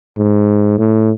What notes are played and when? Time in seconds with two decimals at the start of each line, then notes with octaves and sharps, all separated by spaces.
0.18 G#2
0.79 A2